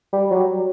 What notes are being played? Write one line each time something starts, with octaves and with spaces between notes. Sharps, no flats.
G3
F#3